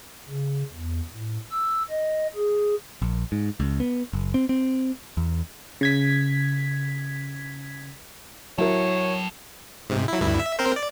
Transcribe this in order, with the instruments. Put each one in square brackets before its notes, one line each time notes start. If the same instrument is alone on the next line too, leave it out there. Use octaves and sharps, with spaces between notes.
[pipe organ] C#3
E2
A2
E6
D#5
G#4
[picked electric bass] A#1
G#2
C#2
B3
F#1
C4
C4
E2
[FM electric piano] C#3 G#6 B6
[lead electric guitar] E3 A4 [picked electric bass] F#3 [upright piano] E4 F#4 A#4 [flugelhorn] C#5
[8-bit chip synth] G#2 C3
F#3 E4
D2 G2 E4
E5
C4 A#4 C5
D5